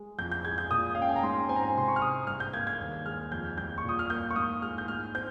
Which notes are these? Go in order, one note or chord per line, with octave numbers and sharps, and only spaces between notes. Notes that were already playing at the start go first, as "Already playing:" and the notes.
Already playing: G#3
F2 G6
G6
G#3 G#6
G6
A#2 D#6
C#4 F5
G5
G#5
A#5
G#2 C6
C4 G#5
A#5
G#5
C3 C6
C#6
F6
G#3 D#6
G2 F6
G6
A#3 G#6
G#6
D#2
G#3 F6
F2 G6
G3 G6
C#6
A#2 D#6
F6
A#3 G6
C#6
G#2 D#6
G#3 F6
G6
G#2 F6
C4 G6